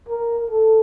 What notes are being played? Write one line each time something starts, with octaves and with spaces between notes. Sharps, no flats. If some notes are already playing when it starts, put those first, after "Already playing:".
A#4
A4